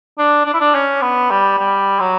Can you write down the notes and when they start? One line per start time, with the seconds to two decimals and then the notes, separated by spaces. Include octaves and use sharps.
0.18 D4
0.46 D4
0.54 E4
0.60 D4
0.74 C#4
1.02 B3
1.31 G3
1.58 G3
2.00 F#3